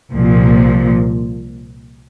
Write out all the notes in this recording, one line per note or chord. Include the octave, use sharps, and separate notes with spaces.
C2 A#2 F3